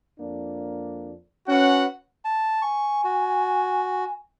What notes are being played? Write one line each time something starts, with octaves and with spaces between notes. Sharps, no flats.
F2 A#3 D4
C#4 F#4 B4 F#5
A5
G#5 C#6
F#4